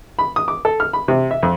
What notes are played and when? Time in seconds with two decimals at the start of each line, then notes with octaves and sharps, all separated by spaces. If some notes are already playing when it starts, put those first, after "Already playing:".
0.19 B5
0.36 D#6
0.48 D6
0.65 A4
0.80 F6
0.93 B5
1.08 C3
1.31 E5
1.43 F2